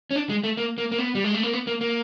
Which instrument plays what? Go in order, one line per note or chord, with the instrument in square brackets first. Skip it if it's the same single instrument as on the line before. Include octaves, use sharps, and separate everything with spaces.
[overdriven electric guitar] C#4
D4
G#3
A3
A#3
A#3
A#3
B3
G3
G#3
A3
A#3
B3
A#3
A#3